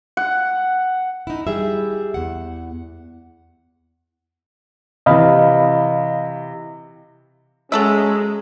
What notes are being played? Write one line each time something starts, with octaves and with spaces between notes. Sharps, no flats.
F#5
D#4 E4
G3 G#4 E5
E2 F#5
C3 E3 D#5 F5 B5
F#3 G#3 C#4 A4 E5